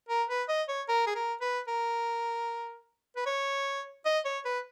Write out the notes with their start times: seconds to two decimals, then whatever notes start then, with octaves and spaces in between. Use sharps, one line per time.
0.09 A#4
0.29 B4
0.49 D#5
0.68 C#5
0.88 A#4
1.07 G#4
1.15 A#4
1.41 B4
1.68 A#4
3.17 B4
3.26 C#5
4.05 D#5
4.25 C#5
4.45 B4